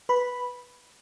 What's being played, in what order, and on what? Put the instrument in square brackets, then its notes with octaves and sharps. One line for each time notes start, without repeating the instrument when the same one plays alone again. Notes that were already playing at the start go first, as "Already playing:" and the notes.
[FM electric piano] B4 B5